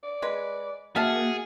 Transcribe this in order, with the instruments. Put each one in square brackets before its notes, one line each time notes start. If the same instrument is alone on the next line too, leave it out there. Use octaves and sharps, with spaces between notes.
[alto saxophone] D5
[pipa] G#3 B4
[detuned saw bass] A#3 [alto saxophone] F#4 [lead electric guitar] G#4 [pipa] E5 F5 A5